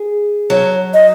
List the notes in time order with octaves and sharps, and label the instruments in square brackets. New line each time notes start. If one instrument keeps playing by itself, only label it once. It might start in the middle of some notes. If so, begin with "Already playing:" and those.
Already playing: [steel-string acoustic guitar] G#4
[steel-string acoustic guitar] F#3 [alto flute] C#5
[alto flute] D#5